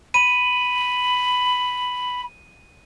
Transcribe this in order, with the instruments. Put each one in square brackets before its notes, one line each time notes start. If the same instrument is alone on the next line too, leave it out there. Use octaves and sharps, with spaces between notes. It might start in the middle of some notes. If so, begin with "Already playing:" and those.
[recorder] B5 [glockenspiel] D#7